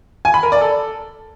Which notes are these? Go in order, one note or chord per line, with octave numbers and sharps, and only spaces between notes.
G#5
B5
A#4
D5
A4